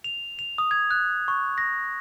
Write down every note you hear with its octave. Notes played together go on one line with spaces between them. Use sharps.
F7
F7
D#6
G#6
F#6
C#6
A#6